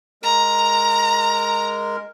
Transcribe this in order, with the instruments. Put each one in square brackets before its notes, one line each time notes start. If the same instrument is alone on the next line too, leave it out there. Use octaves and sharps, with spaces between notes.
[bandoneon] G#3 A#4 [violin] A#5